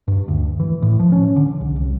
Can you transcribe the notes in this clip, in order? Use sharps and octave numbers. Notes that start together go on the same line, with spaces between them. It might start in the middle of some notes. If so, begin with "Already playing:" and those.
G2
D2
E3
A2
F3
C#4
D3
C2
C2